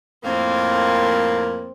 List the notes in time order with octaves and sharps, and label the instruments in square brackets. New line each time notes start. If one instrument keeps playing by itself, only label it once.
[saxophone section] F2 A2 A#3 [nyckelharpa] C4